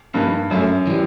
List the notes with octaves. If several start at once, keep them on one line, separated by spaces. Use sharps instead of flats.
G2 F3 A#3 D#4 G#4 B4
F#2 F#3 A3 C#4
E3 G3